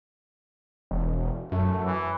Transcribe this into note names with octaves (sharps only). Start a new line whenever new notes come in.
E1
F#2 A3
E3